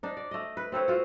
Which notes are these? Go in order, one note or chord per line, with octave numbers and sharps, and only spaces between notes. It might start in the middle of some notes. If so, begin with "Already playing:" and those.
D4 D#4
D5
A3 D#5
B4
C4 A4 B4 C#5
F4 F#4